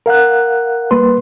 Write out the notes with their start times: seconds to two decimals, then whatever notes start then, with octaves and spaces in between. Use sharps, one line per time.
0.06 A#4 F5 F#5 F#6
0.91 G3 A#3 B4 C6